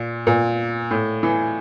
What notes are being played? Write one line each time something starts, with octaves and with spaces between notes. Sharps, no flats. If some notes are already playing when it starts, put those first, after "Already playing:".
Already playing: A#2
A#2
A2
E3